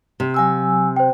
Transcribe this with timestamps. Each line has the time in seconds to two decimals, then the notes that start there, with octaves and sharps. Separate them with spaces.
0.20 C3
0.34 F#3 G#5 E6
0.96 C5 G5